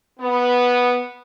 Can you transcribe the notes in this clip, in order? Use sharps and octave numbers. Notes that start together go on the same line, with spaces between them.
B3